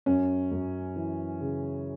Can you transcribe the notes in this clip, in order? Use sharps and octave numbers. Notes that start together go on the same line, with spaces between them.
F#2 C#4
F#2
E3
C#3